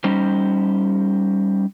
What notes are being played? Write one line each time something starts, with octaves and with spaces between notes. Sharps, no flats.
G3 C#4 D#4 C5